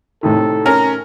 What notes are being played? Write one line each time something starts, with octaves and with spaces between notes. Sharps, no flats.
A2 C3 D#3 A4
C#4 A#4 A#5 F6